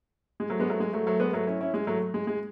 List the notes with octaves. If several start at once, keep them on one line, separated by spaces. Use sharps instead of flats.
G#3
F#3 A3
G#3 B3
F#3 A3
G#3
F#3 A3
F#3 A3
G#3 B3
F#3 A3
C#4 E4
C#4 E4
G#3
F#3 A3
G#3
G#3